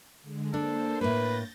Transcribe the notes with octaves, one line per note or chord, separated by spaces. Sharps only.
D3 G#3
A#3 D4 A4 C5
A2 A#3 B4 G6 A6 A#6